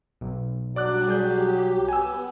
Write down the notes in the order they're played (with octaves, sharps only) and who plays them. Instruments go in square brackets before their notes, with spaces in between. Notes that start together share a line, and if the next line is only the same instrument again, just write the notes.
[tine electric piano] B1
[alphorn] F#3 [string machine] G3 D4 [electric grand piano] D5 D6 F#6
[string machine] G4 [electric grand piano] G#4 G6
[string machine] B3 [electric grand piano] G#5 E6